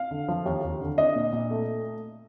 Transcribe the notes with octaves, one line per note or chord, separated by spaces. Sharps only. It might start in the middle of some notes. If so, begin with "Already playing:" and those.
Already playing: F5
D3
F3
D#2
D#2
D3
D4 D#5
A#2
A#2
A3